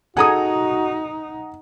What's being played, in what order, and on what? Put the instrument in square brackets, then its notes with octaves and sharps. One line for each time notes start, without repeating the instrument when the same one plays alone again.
[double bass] D#4 [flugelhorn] F#4 [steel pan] G#4 A4 G#5 [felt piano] F#5 A#5 D#6